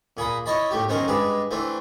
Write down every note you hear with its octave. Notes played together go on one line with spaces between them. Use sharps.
A#2 G#4 B5 D#6
E4 C#5 D#5 A5 B5
A2 A3 G4
F#2 D#3 C4 C#4 G#4 A#4
G2 G#3 G#4 B4 D5
E3 A3 C4 D4